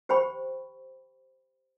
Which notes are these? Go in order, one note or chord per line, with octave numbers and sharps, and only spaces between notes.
G4 C5 G5 B5 C#6